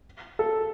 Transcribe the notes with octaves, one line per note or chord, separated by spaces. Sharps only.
A4